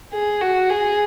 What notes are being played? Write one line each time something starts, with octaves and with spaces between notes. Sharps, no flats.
G#4
F#4
G#4